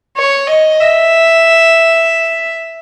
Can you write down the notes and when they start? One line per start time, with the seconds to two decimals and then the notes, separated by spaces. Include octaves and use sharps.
0.17 C#5
0.49 D#5
0.80 E5